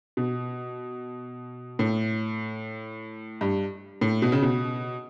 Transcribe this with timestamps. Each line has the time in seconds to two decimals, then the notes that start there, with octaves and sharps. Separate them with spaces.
0.17 B2
1.79 A2
3.41 G2
4.01 A2
4.22 B2
4.32 C#3
4.42 B2